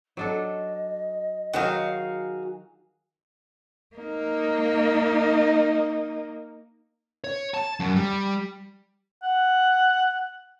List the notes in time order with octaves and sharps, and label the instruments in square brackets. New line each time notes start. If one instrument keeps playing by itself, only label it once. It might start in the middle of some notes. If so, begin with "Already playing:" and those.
[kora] F#3 D4 A4 [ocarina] D#5
[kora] D#3 F#3 D#4 [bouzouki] F#4 G#4 F5
[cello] A#3 D#4
[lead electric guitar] C#5
A5
F#2
G3
[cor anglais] F#5